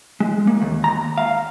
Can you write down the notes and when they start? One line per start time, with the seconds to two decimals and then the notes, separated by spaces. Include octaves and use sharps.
0.20 G#3
0.47 A#3
0.62 D#2
0.84 A#5
1.18 F5